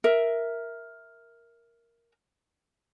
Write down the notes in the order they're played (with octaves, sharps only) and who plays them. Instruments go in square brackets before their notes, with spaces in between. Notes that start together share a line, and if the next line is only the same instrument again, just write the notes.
[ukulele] A#4 E5